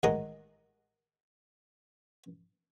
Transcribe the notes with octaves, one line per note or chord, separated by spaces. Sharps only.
A1 D#3 G#3 F#5 A#5 D#6